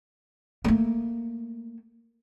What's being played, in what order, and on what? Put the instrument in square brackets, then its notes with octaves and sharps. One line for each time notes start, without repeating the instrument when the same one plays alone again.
[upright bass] A3 A#3